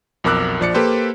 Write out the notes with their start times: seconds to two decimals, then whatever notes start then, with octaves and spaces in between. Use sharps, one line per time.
0.24 B1 F2 A#4 D6 E6 F#6
0.60 A#1 F3 D5 C#7
0.74 A#3 G4 A4 B4 C5